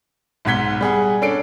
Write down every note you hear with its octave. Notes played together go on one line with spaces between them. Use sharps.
B1 G#2 F#5 G#6 B6 G7
G3 G#4 F#5
C#4 D4 A4 C7 D7